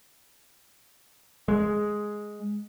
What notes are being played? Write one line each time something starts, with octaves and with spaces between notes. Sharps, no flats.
G#3